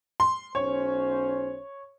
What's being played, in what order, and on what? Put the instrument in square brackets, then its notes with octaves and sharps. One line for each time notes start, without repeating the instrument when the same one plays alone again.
[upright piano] C6
[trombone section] B1 C#4 C5 [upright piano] C#5